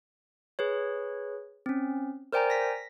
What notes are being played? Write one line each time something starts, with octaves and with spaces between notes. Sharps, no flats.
G#4 B4 C#5
C4 C#4
A#4 C5 D5 G5 G#5 A#5
A#6 B6